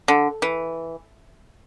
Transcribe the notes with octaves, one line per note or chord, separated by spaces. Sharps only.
D3
E3